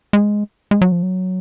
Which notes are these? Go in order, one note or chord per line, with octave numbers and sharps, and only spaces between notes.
G#3
G#3
F#3
F3
F#3